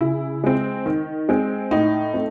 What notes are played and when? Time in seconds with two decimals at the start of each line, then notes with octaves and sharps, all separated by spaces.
0.01 C#3 E4
0.44 G#3 C4
0.86 D#3
1.29 G#3 C4
1.71 A2 D#4
2.14 A3 C4